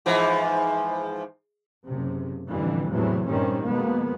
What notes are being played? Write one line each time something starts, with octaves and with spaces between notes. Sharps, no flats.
G#2 E3 F3
F#1 C3
A1 F2 D3 E3 G3
E2 A2 C3 E3 F#3 A3
G2 A#2 D#3 G3 C4 C#4
F2 B2 G#3 A#3 B3